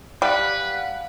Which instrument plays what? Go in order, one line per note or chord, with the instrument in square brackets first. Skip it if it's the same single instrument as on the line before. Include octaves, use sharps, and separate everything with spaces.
[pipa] G3 [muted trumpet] B4 [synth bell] F5 F#5